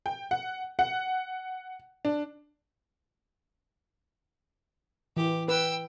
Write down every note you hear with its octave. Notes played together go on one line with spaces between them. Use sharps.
G5
F#5
F#5
D4
E3 G4
B4 G5 E6